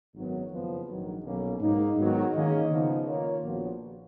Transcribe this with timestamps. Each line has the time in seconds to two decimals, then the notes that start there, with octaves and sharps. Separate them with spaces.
0.14 G#1 F#2 D#3 F#3 B3
0.51 F#1 F2 C#3 F3 B3
0.87 A#1 G#2 D#3 F#3
1.24 B1 B2 A#3 C#4
1.60 G#2 F#3 A#3 D#4
1.97 G#2 D#3 F#3 B3 F#4
2.34 D#3 A#3 C#4 G#4 D#5
2.70 C#3 F3 B3 D#4
3.07 D#3 A#3 F4 A#4 C#5
3.43 A#1 A#2 F3 B3 F#4